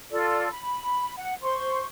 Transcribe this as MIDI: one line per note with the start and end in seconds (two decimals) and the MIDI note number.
0.11 0.49 65
0.11 0.49 69
0.11 0.49 74
0.51 1.14 83
1.16 1.34 78
1.42 1.85 72
1.42 1.85 84
1.42 1.85 85